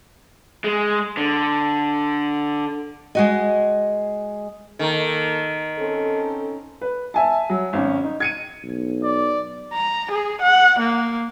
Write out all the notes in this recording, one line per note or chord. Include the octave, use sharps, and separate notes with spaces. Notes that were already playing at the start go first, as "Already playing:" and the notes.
G#3
D3
G#3 F#4 D#5
D#3 A#3 A4
C4 C#4 A4
B4
E5 G#5 A5
F#3
G#1 C#4
D#4
G#6 C#7 D#7
B1
D5
A#5
G#4
F#5
A#3